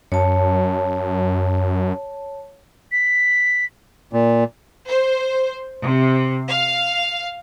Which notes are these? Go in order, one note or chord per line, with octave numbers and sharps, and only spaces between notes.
F#2 C#5 A5
B6
A#2
C5
C3
F5